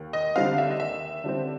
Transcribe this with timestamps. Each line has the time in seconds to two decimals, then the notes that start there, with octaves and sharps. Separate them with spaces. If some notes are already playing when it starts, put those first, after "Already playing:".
Already playing: D#2
0.13 D#5
0.36 D3 G3 C4 F5
0.58 E5
0.70 D#5
0.80 D#2 E5
1.24 D3 G3 C4